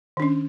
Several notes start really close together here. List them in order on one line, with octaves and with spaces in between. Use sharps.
D#3 D4 C#4